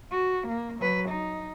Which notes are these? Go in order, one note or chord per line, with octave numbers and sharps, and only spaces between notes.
F#4
A#3
F#3 B4
D#4